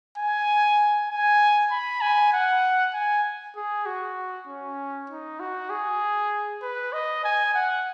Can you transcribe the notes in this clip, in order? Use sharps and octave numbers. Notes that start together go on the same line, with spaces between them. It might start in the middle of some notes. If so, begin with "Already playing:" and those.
G#5
G#5
B5
G#5
F#5
G#5
G#4
F#4
C#4
D#4
F#4
G#4
B4
D#5
G#5
F#5